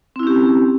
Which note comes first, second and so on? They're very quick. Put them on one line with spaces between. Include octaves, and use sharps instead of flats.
C4 E4 C#4 G4